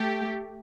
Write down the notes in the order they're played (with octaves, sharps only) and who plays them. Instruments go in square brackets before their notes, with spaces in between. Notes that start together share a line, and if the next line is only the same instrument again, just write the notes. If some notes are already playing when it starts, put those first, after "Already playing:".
Already playing: [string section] A3 G4